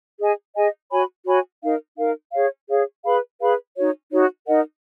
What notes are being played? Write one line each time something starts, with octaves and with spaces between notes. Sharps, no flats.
G#4 D#5 G#5
G#4 D#5 G#5
F#4 C#5 G#5 B5
F#4 C#5 G#5 B5
D#4 A#4 F5
D#4 A#4 F5
G#4 C#5 F5
G#4 C#5 F5
G#4 B4 F5 B5
G#4 B4 F5 B5
D#4 F#4 C#5
D#4 F#4 C#5
D#4 A#4 D#5 F#5